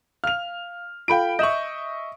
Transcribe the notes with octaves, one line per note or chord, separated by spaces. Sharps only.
F5 F6 F7
F4 A4 F5 G5 B5 D7
D#5 E5 C#6 G6 E7 F#7